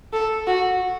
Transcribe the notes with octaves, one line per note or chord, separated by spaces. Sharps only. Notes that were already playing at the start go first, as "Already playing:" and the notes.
A4
F#4